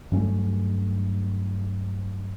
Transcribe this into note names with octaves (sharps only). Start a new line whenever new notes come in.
G2 F#3 A3 C#4